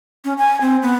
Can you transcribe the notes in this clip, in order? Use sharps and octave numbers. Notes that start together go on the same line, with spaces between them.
C#4
G#5
C4
B3